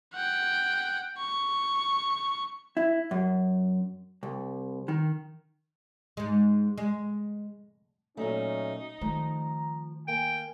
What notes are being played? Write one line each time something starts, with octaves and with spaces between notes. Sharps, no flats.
F#5 G5
C#6
E4
F#2
C2
D#3
G#2 G#3
G#3
A#2 F#3 A3 C#4 D#4
D#3 F3 A3 A#5
A#3 G5 G#5